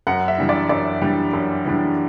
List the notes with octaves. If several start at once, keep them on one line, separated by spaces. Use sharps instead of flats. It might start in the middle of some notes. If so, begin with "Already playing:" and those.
F#2 F#5
E5
E3 G3 D4
D5
F#2 D5
E3 G3 D4
F#2
E3 G3 D4